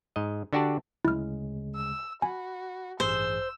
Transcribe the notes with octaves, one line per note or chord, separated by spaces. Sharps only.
G#2 D#5
D3 D4 F#4 G4 D5 A5
D2 C#3 G#3 E4 F6
E6
F#4 G#5 B5
A1 G2 G#4 C5 E6